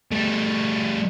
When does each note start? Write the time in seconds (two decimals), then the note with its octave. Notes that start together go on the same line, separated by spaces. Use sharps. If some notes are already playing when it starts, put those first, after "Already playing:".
0.11 G3 A3